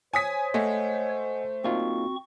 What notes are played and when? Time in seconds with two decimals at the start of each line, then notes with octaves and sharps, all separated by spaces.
0.14 C5 C#5 G#5 D#6 B6
0.54 A3 D#5 F#5 G#5
1.64 A#3 C4 D#4 F4 F#4 C#6